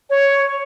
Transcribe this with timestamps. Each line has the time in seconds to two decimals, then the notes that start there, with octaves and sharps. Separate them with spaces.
0.09 C#5